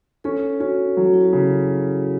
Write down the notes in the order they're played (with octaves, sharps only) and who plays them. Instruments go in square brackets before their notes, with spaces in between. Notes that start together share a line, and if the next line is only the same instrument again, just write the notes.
[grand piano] C#4 [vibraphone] A4
[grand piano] C#4 [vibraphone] F#4
[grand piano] F#3
[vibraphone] E4
F#4
[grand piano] C#3